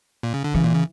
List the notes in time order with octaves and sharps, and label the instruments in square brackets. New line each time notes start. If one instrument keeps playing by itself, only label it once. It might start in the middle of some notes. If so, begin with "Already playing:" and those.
[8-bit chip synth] A#2
C#3
D3
[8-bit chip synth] C#3 [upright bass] E3
[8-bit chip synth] A#2
C#3